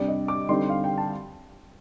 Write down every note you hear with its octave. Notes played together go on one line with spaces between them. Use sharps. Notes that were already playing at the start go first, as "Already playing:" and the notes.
Already playing: C3 G3 D4 D5
D#5
D6
D3 G3 C4 D#4 C6
F5
G5
A5